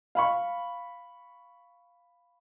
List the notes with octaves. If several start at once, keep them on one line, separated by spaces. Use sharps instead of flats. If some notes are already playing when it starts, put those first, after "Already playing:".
F5 B5 C#6